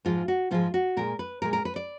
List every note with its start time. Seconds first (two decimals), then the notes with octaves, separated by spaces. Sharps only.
0.05 G#2 F3 G#3 F4
0.28 F#4
0.51 G#2 F3 G#3 F4
0.74 F#4
0.97 A#2 G#3 A#4
1.19 B4
1.42 A#2 G#3 A#4
1.53 A#4
1.65 B4
1.76 D5